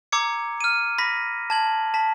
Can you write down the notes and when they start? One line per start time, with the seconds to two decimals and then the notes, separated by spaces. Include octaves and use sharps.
0.12 A#5 D6 E6 G#6 C#7
0.61 F6 D#7
0.98 B5 A#6 B6
1.50 A5 G#6 F#7
1.94 A5 B6